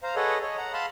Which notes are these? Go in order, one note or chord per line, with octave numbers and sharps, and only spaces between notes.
C5 F5 A#5
G#4 A4 B4 C#5 D#5 F#5
C#5 D#5
F#5 A#5
F5 A5 B5 C6